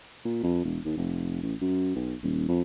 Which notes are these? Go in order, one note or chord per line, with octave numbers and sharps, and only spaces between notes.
A#2
F2
E1
D#2
F1
A1
F#2
B1
D#1
F2